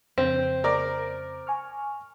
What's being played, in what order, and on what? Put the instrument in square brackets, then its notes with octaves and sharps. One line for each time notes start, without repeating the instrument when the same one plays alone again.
[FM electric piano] F2 C#3 [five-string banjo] C4
[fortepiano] A#4 D5
[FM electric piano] G#5 C#6 F6